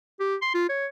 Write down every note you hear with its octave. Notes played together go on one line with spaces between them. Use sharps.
G4
C6
F4
C#5